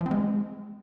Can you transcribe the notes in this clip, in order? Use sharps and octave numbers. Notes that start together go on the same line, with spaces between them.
F3
C4
G#3